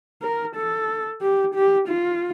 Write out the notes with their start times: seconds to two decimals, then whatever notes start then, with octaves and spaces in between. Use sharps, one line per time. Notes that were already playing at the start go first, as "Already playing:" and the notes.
0.22 A#4
0.56 A4
1.21 G4
1.54 G4
1.88 F4